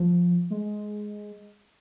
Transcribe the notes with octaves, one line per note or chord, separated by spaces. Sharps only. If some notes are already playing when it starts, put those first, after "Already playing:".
Already playing: F3
G#3